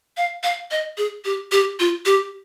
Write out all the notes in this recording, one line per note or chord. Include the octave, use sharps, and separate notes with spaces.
F5
F5
D#5
G#4
G4
G4
F4
G4